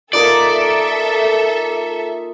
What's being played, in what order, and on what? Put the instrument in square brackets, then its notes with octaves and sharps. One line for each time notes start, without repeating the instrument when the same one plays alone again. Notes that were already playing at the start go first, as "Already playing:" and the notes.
[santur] A#3 D#4 F4 [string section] A4 E5 [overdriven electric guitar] D5